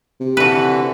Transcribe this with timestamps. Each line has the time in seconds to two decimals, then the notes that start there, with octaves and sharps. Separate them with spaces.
0.20 C3
0.37 D3 E3 F#4 B4